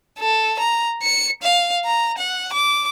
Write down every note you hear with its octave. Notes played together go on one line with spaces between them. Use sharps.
A4
A#5
C#7
F5
A#5
F#5
D6